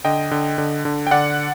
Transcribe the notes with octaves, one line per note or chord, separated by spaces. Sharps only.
D3 D#5 G5
D3
D3
D3
G5
D3 D5 F#5